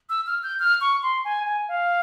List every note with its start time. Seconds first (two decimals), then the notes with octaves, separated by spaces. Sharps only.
0.09 E6
0.27 F6
0.43 G6
0.59 F6
0.81 C#6
1.03 C6
1.25 G#5
1.46 G#5
1.68 F5